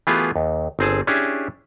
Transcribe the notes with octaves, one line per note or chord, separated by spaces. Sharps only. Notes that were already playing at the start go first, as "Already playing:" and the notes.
E3 A3 B3 F4 G4 G#4
D#2
G1 C4 G#4 A5
C#4 D4 E4 G4 G#4